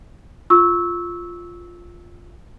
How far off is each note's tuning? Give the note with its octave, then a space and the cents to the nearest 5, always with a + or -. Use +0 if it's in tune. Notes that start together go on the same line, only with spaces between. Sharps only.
F4 +0 C#6 +0 E6 -15